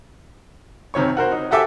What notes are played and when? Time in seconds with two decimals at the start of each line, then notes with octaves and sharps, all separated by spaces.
0.94 F#1 C3 D#3 C#5 C#6
1.17 F#4 A#4 C5
1.32 D#4
1.51 F#4 G4 A4 E5 G#5 D6